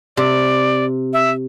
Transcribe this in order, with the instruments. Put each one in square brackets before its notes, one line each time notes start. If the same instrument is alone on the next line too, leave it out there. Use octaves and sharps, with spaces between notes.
[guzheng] C3 [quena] D5
[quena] E5